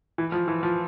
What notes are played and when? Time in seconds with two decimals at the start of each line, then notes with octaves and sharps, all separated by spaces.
0.18 E3
0.32 F3
0.48 E3
0.63 F3